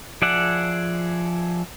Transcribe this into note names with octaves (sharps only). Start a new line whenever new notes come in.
F3 G#4 D5 E5 F#5